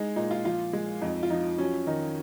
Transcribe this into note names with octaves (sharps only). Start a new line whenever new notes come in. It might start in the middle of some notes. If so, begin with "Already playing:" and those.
Already playing: G#3 D#4
A#2 D#4
F4
F3 F4
G#3
F2 D#4
F4
F3 D#4
F#3 C#4
D#3 D#4